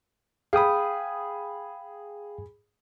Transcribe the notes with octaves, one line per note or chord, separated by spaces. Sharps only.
G#4 F5 G5 B5 D#6